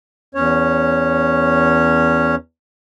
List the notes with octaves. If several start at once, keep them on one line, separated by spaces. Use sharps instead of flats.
E2 C#4 C#5